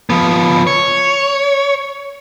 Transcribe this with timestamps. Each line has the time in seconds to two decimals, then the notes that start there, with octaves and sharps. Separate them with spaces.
0.10 F3 B3
0.67 C#5